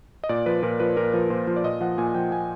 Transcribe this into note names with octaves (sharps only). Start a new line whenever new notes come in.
D#5
A#2 D5
F3 B4
A#2 A#4
F3 B4
A#2 A#4
F3 B4
A#2 C5
F3
D5
A#2 D#5
F3 F#5
A#2 G#5
F3 G5
A#2 G#5